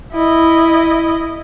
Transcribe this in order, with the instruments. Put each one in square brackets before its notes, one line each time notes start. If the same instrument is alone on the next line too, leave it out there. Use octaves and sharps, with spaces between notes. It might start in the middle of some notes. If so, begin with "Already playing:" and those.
[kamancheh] E4 D#5